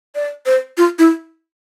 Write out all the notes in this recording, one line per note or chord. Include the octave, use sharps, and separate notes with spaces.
D5
C5
F4
E4